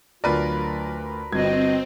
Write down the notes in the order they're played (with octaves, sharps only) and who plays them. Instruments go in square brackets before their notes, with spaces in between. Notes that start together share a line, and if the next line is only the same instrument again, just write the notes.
[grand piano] D2 F4 D5 [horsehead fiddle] F#3 [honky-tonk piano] A#4 B4
[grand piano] G1 G#6 [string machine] C4 [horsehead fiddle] F#4 D#5